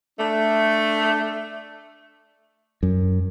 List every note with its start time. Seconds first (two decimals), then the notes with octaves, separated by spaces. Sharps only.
0.19 A3 D4
2.83 F#2